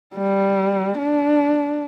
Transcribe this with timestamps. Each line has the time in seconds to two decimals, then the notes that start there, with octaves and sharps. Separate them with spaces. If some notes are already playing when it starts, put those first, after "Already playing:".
0.16 G3
0.98 D4